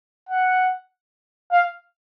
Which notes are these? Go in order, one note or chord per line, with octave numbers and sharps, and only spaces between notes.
F#5
F5